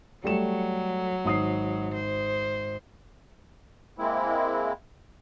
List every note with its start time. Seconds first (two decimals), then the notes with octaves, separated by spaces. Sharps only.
0.24 F#3 G3 A3 E7
1.25 G#1 D#6 C7
1.94 C5
3.98 G#3 A#3 C4 E4